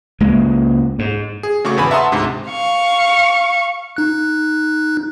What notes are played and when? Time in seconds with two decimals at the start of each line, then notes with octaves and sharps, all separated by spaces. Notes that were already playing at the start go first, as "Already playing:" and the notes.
0.20 C#2 G#3 A#3
0.99 G#2
1.43 G#4
1.65 C#3 A3 F#4 C#5 C#6 D6
1.77 G#1 E2 B4 G#5 B5
1.91 E5 F#5 A5 A#5 C6 D#6
2.12 D2 G#2 C3
2.50 F5 C#6
3.96 D#4 F#6